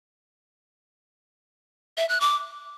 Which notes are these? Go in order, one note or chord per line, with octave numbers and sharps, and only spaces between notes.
E5
F#6
D6